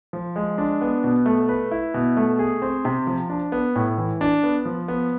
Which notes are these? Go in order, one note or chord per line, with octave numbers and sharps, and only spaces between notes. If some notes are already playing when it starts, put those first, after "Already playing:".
F3
G#3
D4
B3
B2
A3
B4
E4
B2
A3
G#4
C4
C3
F3
D4
B3
A2
E3
D4
B3
F3
B3